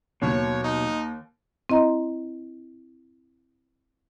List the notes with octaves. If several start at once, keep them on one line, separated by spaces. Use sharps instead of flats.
D#2 B2 F#3 C#5
D#4
C4 E4 D#5 A#5 C6